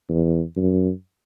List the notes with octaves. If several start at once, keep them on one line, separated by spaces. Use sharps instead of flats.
E2
F#2